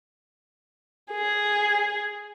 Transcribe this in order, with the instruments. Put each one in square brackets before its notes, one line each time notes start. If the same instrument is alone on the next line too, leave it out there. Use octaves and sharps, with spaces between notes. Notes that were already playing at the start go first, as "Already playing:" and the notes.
[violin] G#4